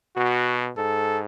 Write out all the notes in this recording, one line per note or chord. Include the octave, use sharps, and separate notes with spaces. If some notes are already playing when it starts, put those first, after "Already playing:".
B2 F#4
G#2 A4